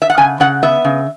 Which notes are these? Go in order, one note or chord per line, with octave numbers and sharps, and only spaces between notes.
E5
F#5
C#3 G#5
C#3 F#5
B3 E5
C#3